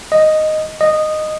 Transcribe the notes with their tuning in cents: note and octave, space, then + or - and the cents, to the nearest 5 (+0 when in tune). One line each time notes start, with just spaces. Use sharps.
D#5 +0
D#5 -10